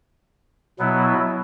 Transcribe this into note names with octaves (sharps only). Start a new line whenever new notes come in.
B2 F#3 B3 E4